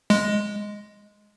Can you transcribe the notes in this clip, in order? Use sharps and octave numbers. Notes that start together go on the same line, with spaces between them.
G#3